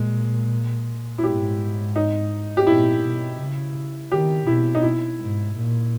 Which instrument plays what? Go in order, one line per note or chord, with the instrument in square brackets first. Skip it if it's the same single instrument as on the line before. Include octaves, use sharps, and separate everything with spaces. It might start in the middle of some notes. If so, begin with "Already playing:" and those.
Already playing: [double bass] A#2 [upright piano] G#3
[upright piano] E4
[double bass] G#2 [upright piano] G4
[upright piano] D#4
G4
[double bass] A#2 [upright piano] E4
[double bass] B2
C#3
[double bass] D#3 [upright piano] G4
[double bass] B2 [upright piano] E4
[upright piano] D#4
E4
[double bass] G#2
A#2